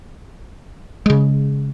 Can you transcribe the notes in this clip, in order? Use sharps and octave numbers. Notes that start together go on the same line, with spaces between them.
C#3 G#3